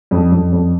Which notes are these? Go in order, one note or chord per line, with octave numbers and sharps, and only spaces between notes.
F2
F2
F2